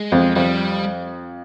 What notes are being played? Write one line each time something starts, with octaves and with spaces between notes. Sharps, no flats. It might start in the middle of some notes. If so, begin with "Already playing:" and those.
Already playing: G#3
F2
F2 G3